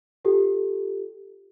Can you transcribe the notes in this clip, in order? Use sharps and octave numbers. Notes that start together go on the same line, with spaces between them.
F4 G4 A4